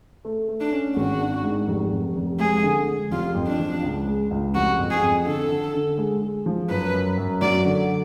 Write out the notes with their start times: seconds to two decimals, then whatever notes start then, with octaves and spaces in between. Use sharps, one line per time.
0.25 A3
0.48 A3
0.60 D4
0.72 C#4
0.96 G#1 F#4
1.20 D4
1.44 G#2
1.68 F1
1.92 F1
2.16 F1
2.39 G#3 G#4
2.63 D3
2.87 G#3
3.11 F1 F4
3.35 F2
3.47 D4
3.59 F3
3.83 C#2
4.07 G#3
4.31 C#2
4.55 F1 F#4
4.79 F2
4.90 G#4
5.02 F2
5.26 D3 A4
5.50 D3
5.74 D3
5.98 G#3
6.22 G#3
6.46 F3
6.69 F#2 B4
6.93 F#2
7.18 F#2
7.41 F#3 D5
7.65 D3